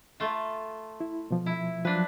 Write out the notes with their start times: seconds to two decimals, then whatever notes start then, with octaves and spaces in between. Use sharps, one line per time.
0.20 A3 F4
1.00 E4
1.31 B2 F3
1.46 E4
1.85 F3 F#3 D4 B4